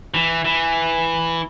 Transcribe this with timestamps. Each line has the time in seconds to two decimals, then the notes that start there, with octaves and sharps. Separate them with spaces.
0.14 E3
0.44 E3